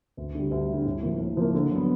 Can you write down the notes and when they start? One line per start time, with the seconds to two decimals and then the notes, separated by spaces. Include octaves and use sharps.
0.17 D2
0.35 D3 G3
0.51 D2
0.69 D3 G3
0.85 A2
1.02 F3 A#3
1.20 A2
1.37 F3 A#3
1.55 D3
1.72 F#3 B3